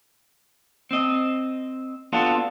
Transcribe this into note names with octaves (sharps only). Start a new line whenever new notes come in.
C4 D#5
B3 D4 F4 F#4 A4